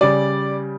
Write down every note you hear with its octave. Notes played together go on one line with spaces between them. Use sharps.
C#3 G3 D5